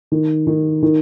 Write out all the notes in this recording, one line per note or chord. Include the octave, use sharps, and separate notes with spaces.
D#3
D#3
D#3